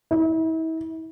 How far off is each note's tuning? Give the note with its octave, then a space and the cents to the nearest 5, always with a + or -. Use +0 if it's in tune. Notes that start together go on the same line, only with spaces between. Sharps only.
E4 -40